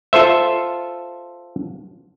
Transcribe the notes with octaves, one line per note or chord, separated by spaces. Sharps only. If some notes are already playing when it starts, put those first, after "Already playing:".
F4 A4 C5 E5